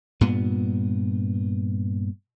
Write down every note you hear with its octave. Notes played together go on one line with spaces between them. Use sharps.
G2 A#2 B3